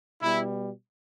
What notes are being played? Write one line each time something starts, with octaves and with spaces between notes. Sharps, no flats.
B2 G3 B3 E4